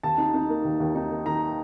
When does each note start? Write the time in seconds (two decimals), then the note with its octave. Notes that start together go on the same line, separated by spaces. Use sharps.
0.03 D#2 A5
0.18 D#4
0.34 D#4
0.49 A#3
0.65 D#2
0.80 D#2
0.95 D#4
1.10 D#3
1.26 D#3 A#5